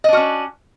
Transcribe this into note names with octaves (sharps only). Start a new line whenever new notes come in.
C#4 D4 F#4 D#5